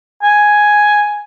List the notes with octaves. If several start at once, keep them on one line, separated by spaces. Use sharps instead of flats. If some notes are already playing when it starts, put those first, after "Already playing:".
G#5